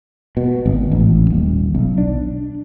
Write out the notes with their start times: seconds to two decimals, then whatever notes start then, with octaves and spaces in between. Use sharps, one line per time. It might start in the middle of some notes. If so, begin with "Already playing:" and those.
0.37 B2
0.66 G#1
0.92 A1
1.30 D#1
1.75 B1
1.98 D4